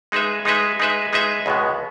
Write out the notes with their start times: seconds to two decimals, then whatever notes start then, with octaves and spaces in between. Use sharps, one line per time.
0.12 G#3 D#4 G#4 B4 E5
0.45 G#3 D#4 G#4 B4 E5
0.79 G#3 D#4 G#4 B4 E5
1.13 G#3 D#4 G#4 B4 E5
1.46 C#2 B2 G#3 B3